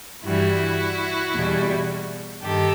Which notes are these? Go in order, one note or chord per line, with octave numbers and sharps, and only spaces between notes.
G2 E3 G3 E4 F#4
E2 B2 G3
G2 D#3 G4 A4